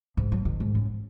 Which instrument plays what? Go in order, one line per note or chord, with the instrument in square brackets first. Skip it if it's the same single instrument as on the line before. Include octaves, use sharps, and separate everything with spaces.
[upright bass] G#2
F#3
D#3
G#2
F#2